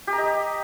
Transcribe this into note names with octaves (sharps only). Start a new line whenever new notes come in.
G4
A#5
D#5